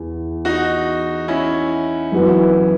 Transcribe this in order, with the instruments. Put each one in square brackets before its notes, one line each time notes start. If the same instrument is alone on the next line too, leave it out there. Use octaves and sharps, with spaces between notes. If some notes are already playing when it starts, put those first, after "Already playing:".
Already playing: [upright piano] E2
[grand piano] D#4 F#4
C#4 E4
[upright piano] F#2 E3 B3 F#4